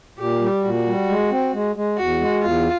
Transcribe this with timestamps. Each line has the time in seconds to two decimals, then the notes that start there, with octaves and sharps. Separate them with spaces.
0.18 A#2 G4
0.41 G3
0.64 A#2 F#4
0.86 G3
1.09 G#3
1.31 C4
1.53 G#3
1.76 G#3
1.98 E2 F#4
2.21 G#3
2.43 E2 F4